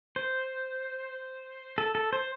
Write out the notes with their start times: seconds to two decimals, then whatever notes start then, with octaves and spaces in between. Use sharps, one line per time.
0.16 C5
1.78 A4
1.95 A4
2.13 C5